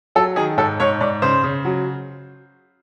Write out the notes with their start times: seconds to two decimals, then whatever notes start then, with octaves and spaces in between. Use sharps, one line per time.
0.15 F#3 A4
0.36 D#3 G#4
0.57 G#2 A4
0.80 G#2 C#5
1.01 G#2 D5
1.22 C#3 C5
1.44 C#3
1.65 F#3